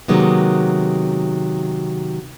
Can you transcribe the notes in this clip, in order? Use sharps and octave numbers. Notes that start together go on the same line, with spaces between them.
C3 D#3 F#3 G#3 A#3 B3